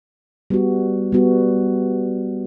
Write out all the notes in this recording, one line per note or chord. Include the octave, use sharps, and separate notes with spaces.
G3 B3 F#4
G3 B3 F#4